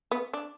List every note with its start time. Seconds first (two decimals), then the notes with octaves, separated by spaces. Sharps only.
0.11 B3
0.33 D4